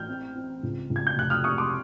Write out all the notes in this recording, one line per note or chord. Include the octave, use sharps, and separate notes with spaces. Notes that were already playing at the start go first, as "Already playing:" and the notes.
Already playing: A1 F6 G6
C4
C4
C#2
C#2
G#6
G6
F1 F#6
D#6 F6
C3 C#6 D#6
C6 D6